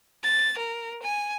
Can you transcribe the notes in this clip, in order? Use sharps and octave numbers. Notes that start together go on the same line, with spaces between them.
A6
A#4
G#5